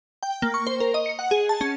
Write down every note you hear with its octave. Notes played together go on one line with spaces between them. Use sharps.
G5
A#3
C#6
C5
A#4
D#5
C#7
F#5
G#4
A5
C#4